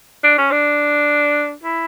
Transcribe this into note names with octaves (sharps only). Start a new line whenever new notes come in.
D4
C#4
D4
E4